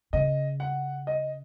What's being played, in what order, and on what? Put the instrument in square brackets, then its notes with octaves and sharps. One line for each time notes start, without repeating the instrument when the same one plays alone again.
[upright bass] C#3 [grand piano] D#5
[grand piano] F#5
D#5